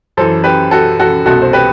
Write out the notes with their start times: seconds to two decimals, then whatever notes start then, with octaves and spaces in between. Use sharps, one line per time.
0.17 F#2 E3 A4 C5
0.44 G4 B4
0.71 F#4 A4
0.99 F#4 A4
1.26 C2 B2 F#4 A4
1.42 C5
1.53 G4 B4